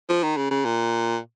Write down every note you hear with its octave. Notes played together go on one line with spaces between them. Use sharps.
F3
D#3
C#3
C#3
A#2